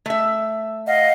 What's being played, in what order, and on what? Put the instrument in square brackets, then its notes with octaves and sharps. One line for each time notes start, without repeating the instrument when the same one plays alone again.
[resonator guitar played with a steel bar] A3 E5
[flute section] D#5 F5 F#5